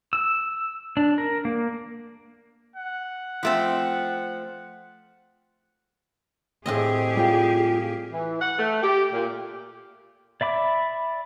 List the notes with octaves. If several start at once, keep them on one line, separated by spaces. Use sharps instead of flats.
E6
D4
A#4
A#3
F#5
F3 A3 C4
A2 C4 G4 G#4 D#5
G3 F4 G5
E3
F#5
A3
G4
A#2
D5 E5 B5 D6